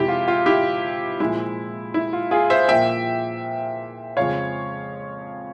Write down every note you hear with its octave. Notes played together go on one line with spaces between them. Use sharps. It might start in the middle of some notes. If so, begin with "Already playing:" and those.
Already playing: F2 C3 F3 G#3 E4 G4
F4
F4
E4 G4
A#2 F3 G#3 E4
E4
F4
F4 G#4
C5 E5
A#2 F3 A#3 E5 G5
F2 C#3 F3 G#3 C#5 F5